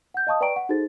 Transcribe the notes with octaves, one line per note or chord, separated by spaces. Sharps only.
F#5 G6
D#5 F5 A5 C#6 D#6
B4 D5 G5 A#5 C#6 D7
F#5
D#4 F#4 G#4 A4 C5 A6